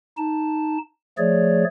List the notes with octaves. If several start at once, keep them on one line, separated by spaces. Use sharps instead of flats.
D#4 A5
F3 A3 G#4 C#5 D5